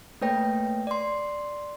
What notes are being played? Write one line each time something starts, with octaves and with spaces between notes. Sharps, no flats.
A3 A#3 B4 C#5 G5 A#6
D5 C6